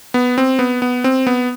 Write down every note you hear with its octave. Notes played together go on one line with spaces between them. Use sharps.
B3
C4
B3
B3
C4
B3